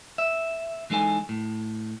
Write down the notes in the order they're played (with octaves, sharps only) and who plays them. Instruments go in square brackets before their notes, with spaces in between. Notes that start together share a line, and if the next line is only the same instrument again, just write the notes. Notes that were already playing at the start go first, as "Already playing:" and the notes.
[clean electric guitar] E5
E3 G#3 D#4 A4 G#5
A2